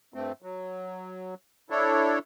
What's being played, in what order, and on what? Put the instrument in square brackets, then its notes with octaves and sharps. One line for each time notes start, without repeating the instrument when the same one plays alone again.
[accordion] G2 A3 C4
F#3
D4 E4 A4 C#5